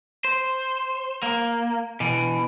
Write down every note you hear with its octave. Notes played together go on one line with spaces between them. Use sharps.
C5
A#3
B2 E3